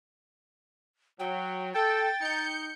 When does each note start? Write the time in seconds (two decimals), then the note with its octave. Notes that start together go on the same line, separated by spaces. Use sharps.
1.19 F#3 G5
1.74 A4 G5 A6
2.21 D#4 G6 C#7